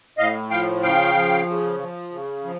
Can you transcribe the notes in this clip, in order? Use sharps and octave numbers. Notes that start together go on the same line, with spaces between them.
A2 D#5 F5
F3 F5 G5
C#3 F5 G5
F3
C#3
F3
C#3
F3